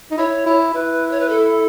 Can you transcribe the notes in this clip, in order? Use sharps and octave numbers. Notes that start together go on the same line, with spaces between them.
D#4
E4 C#5
E4
E4 B4
C#5
B4
A4